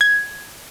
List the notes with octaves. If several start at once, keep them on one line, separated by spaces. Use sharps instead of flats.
G#6